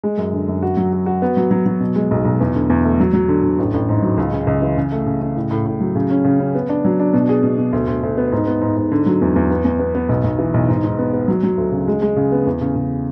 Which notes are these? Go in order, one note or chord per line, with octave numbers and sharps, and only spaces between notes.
G#3
F#2
D3
F#2
F#4
F#3
F#4
F#4
B3
F#3
F#3
F#3
B2
G#3
B1
B1
E2
D3
E2
A3
F#3
F#3
D3
D3
A1
A1
G#2
F#3
C#2
C#3
C#2
E3
C#3
A3
C#3
C#3
A2
A2
A2
F#3
C#3
C#4
C#3
C#4
B3
D4
F#3
D4
B2
G#4
B2
B2
D2
D2
D2
B3
G#2
B3
G#2
G#2
D3
F#3
E2
E2
B3
E2
B3
B3
B1
B1
E3
B1
G#2
G#2
B3
B3
F#3
F#3
D2
C#3
G#3
G#3
C#3
B3
E2
C#3
C#3